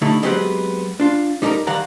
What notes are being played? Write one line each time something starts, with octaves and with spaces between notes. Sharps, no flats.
D3 G3 A3 D#4 E4
F#3 G#3 B3 C4 G4 F#5
D4 F4
G3 D#4 G4 A4 A#4
D#3 G3 F5 F#5 A#5